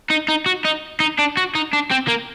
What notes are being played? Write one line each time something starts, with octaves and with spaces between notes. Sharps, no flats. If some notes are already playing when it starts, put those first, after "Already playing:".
D#4
D#4
F#4
D#4
D#4
D4
F#4
D#4
D4
C4
A#3